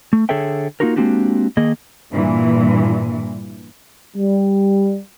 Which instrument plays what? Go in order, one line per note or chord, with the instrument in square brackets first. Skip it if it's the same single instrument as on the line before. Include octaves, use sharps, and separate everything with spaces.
[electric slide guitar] A3
D3 G#4 A4 C#5 E5 G5
A#3 C#4 D#4 F4 F#4 A#4
G#3 A#3 C4 D4 F#4 G4
D#3 A#3 G#4 D#5
[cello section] G2 A#2 E3
[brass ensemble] G3